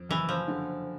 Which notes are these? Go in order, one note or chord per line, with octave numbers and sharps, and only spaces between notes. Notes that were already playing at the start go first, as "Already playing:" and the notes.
Already playing: F2
F#1 E3
F3
D3